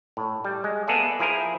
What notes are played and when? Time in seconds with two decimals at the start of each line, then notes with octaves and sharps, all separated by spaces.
0.17 A2
0.44 G3
0.64 G#3
0.87 A#3 B3 G#4 A4 D5 E5
1.19 F3 E4 G#4 A#4 C5